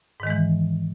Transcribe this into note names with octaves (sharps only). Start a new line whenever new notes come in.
G#2 D#3 E3 G#3